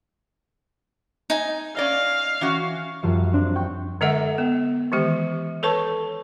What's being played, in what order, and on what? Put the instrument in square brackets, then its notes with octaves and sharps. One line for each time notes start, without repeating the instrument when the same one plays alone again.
[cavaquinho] D#4 G#5
[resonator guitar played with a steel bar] C#4 D5 D#5 [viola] F5
[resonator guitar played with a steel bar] E3 C#4 F#4
[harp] F#2 F3 G3 E5 C#7
C4 D4
G5 C#6 G6
[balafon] D3 G#3 A4 D#5 E5 F#5
B3
D#3 E3 G#3 G4
A4 B4 C#5 A5 C#6